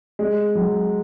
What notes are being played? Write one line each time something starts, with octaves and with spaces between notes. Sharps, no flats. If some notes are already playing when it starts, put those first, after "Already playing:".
G#3
F#3